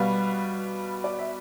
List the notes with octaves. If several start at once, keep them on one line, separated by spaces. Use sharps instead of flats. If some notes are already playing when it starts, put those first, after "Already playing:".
Already playing: B2 G3 B3 F5
D5
E5